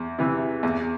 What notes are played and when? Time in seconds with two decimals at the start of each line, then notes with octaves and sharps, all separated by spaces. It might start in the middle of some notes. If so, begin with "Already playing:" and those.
Already playing: E2
0.19 C3 E3
0.63 E2